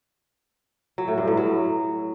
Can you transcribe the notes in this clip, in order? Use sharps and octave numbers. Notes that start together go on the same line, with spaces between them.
F#3
A2
G2
A2
F#3